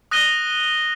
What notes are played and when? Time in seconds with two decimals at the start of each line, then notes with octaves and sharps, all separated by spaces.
0.11 D#6 F#6 A#6 D#7 G7